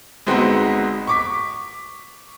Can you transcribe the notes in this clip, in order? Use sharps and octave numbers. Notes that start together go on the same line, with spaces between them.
G1 G#3 B3 C4 D#4 F#4
C#6 D6 B6